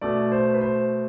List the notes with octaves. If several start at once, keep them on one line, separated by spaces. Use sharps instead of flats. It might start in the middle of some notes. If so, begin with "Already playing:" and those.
B2 A3 D5
C5
B4
C5